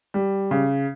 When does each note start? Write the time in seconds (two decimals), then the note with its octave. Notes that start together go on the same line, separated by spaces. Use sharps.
0.14 G3
0.51 C#3